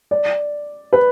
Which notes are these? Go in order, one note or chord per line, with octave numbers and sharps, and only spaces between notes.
D5
B4